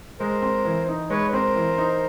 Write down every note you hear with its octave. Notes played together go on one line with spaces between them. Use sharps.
G#3 A#4 C5
C4
E3
D#4
G#3 B4 C#5
C4 A#4 C5
E3
D#4